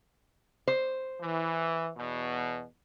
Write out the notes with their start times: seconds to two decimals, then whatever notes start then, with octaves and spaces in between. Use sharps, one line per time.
0.68 C5
1.21 E3
1.97 E2 B2